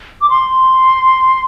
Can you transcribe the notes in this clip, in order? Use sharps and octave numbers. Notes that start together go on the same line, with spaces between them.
D6
C6